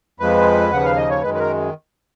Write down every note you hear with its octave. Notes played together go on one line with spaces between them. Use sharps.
F2 F3 G#3 B4
D#2 C#3 F3 F#5
F5
D#5
C#5
F#2 D#3 G#3 B4
B4
A#4